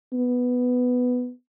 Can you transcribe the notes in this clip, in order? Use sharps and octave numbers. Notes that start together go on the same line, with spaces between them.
B3